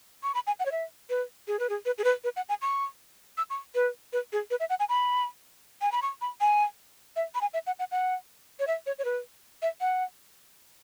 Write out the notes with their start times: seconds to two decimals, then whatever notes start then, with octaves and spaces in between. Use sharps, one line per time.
0.23 C#6
0.34 B5
0.47 G#5
0.59 F#5
0.66 C#5
0.72 E5
1.10 B4
1.47 G#4
1.59 B4
1.69 G#4
1.85 B4
1.98 G#4
2.04 B4
2.24 B4
2.36 F#5
2.49 G#5
2.62 C#6
3.37 E6
3.50 C#6
3.75 B4
4.13 B4
4.32 G#4
4.50 B4
4.60 E5
4.70 F#5
4.79 G#5
4.89 B5
5.81 G#5
5.92 B5
6.02 C#6
6.21 B5
6.41 G#5
7.16 E5
7.35 B5
7.41 G#5
7.53 E5
7.66 F#5
7.79 F#5
7.91 F#5
8.59 C#5
8.67 E5
8.86 C#5
8.98 C#5
9.05 B4
9.62 E5
9.81 F#5